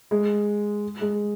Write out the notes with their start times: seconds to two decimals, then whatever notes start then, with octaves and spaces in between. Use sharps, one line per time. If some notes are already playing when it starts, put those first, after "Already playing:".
0.11 G#3
1.01 G#3